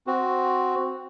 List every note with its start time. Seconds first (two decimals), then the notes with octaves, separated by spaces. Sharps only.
0.07 C4 F#4